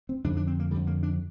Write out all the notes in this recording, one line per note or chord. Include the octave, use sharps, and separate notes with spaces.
C4
F2 D3 D4
D4
C4
A#3
F2 D3 G3
A#3
D4